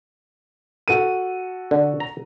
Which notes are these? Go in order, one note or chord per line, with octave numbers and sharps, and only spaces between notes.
F#4 A4 D#7
D3
A#5